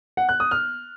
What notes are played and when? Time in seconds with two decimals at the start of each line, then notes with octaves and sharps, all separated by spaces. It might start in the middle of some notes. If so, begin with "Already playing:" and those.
0.17 F#5
0.29 F#6
0.40 D#6
0.51 F6